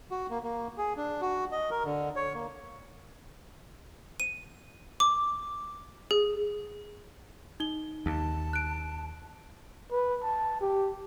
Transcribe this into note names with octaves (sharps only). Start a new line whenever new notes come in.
F#4
A#3
A#3
G#4
D4
F#4
D#5
A#4
D3
C#5
A#3
D#7
D6
G#4
D#4 G7
D#2 A5
F#6 D7
B4
A5
G4